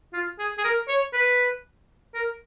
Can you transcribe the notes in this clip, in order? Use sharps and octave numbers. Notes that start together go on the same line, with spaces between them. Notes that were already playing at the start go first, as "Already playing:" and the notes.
F4
G#4
G#4
A#4
C#5
B4
A#4